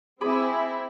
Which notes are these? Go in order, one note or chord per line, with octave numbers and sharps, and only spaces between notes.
C4 E4 G#4 B5 D6